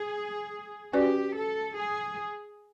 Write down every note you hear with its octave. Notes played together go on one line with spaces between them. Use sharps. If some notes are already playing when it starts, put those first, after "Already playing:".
Already playing: G#4
C#4 F#4 G4 B4 D5
A4
G#4